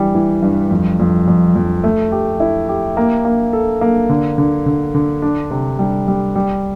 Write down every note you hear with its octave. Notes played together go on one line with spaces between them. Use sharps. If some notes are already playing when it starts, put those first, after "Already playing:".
Already playing: E3 G3
E3
G2
F2
F2
F2
F2
A3
G4
E4
G4
A#3
A#3
A4
A#3
D3
D3
D3
D3
D4
C3
G3
G3
G3